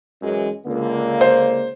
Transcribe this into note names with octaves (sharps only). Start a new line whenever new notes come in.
F#2 E3 G#3
C#2 D3 A#3
C5